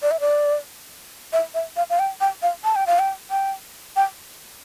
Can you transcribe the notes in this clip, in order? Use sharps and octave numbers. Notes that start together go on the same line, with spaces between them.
D5
E5
D5
E5
E5
F5
F5
G5
G5
F5
A5
G5
F5
G5
G5
G5